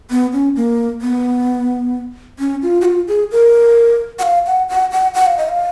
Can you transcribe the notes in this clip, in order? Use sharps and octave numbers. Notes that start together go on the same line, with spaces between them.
B3
C#4
A#3
B3
C#4
F4
F#4
F4
G#4
A#4
F#5
F5
F#5
F#5
F#5
F#5
F5
D#5
F5